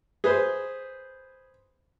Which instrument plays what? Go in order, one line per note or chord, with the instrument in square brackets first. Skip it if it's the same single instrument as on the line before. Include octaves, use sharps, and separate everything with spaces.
[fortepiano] G#4 B4 C5